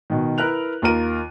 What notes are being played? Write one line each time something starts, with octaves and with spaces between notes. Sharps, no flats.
B2 D#3
E4 A#4 B4 F#6 F7
D#2 F4 A#4 D#7